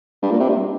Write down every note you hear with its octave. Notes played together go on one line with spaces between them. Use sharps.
G2
A#2
C3
G2